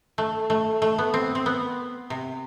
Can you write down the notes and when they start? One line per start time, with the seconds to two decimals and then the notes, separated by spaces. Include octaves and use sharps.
0.18 A3
0.50 A3
0.82 A3
0.98 B3
1.14 C4
1.35 C4
1.46 B3
2.10 C3